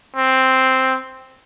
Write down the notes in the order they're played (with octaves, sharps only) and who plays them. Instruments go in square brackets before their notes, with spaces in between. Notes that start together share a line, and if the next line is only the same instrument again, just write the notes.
[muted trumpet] C4